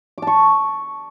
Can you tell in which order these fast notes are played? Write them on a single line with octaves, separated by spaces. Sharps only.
D6 A5 C#6